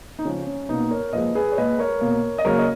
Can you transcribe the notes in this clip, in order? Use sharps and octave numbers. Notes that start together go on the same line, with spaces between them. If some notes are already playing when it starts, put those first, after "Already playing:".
D#4
C#3 F3 G#3 C#4
C#4
B2 A#3 B3 D#4
A#4 C#5
A#2 F3 G#3 B4 D#5
G#4 B4
C#5
A#2 G#3 B4 D#5
A#4 C#5
B2 A#3
D#5
C#3 F#3 A#3 A#4 C#5
D#5